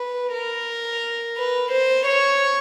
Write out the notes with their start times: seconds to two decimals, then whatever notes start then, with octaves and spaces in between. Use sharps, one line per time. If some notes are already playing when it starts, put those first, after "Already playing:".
Already playing: B4
0.33 A#4
1.37 B4
1.72 C5
2.06 C#5